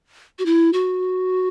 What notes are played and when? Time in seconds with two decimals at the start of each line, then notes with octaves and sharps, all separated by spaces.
0.39 F#4
0.46 E4
0.73 F#4